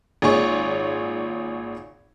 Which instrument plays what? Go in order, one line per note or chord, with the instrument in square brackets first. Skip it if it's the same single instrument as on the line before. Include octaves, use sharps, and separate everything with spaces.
[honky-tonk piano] G#1 A#2 G#4 C#5 C#6